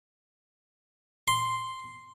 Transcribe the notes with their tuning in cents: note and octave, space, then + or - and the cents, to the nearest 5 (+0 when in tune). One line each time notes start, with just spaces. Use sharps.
C6 -5